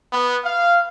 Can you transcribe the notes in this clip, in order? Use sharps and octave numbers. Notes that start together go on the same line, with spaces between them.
B3
F5